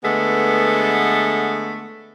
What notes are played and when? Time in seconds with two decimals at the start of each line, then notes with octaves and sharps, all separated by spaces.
0.03 D3 G#3 A3 B3